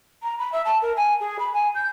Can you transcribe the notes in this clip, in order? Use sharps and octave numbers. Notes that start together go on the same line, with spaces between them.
A#5
B5
E5
A5
A#4
G#5
G#4
B5
G#5
G6